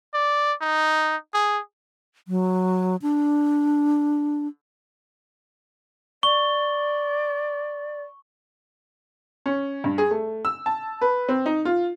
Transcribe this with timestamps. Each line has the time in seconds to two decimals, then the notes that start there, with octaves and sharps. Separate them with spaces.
0.14 D5
0.61 D#4
1.34 G#4
2.28 F#3
3.02 D4
6.23 D5 C#6 G7
9.46 C#4
9.84 G2
9.98 G#4
10.11 A3
10.45 E6
10.66 A5
11.01 B4
11.29 C4
11.46 D#4
11.65 F4